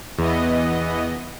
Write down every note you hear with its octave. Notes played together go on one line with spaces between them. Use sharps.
E2 E3 B3 D#5